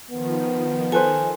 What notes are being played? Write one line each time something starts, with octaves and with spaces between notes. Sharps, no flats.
D#3 F3 B3
A4 B4 C5 G#5